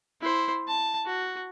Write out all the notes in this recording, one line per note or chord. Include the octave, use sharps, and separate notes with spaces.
E4 C5
A5
F#4